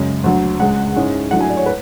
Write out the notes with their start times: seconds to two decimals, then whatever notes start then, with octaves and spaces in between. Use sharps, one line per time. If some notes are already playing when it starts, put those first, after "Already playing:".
Already playing: F#2 C#3 G#3
0.24 D2 D3 F#3
0.60 C#2 C#3 G#3 F#5
0.96 G#2 G#3 C#4 E4
1.31 A2 F#3 A3 D4 F#5
1.41 G#5
1.49 D5
1.57 C#5
1.66 B4